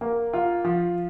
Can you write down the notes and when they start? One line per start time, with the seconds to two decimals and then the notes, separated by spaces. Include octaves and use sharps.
0.01 A#3
0.33 F4
0.65 F3